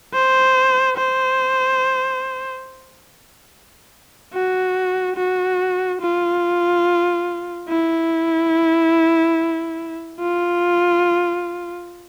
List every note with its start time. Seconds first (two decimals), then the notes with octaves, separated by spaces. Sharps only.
0.14 C5
0.97 C5
4.33 F#4
5.16 F#4
6.01 F4
7.68 E4
10.20 F4